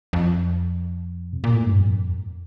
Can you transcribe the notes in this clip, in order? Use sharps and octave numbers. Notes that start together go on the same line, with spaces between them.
F2
C3
A#2
A2
G2
F2